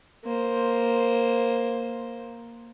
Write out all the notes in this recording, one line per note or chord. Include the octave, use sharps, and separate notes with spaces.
A#3 C5